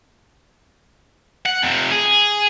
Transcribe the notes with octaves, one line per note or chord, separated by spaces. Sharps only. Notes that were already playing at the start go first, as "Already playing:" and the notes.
F#5
F2 C3
G#4